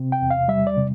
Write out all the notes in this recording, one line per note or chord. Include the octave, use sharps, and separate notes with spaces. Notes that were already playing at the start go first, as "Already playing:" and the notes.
Already playing: C3 C4
G5
E2
F5
G3 E5
D5
C3